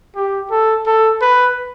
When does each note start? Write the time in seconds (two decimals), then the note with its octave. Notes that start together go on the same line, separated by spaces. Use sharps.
0.16 G4
0.51 A4
0.86 A4
1.21 B4